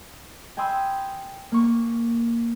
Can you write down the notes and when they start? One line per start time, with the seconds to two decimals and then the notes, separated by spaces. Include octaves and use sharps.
0.57 G5 G#5 B5 C6 D#6 E6
1.52 A#3 C#6